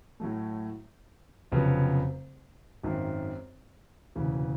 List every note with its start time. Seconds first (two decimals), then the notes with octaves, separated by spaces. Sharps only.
0.20 A2 F#3 A3
1.52 F1 F2 C#3 F#3 B3
2.83 G#1 F#2 D#3
4.15 E1 D2 C#3 E3